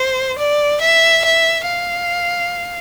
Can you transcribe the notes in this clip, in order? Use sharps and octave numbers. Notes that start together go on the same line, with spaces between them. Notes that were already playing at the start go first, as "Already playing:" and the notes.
Already playing: C5
D5
E5
E5
F5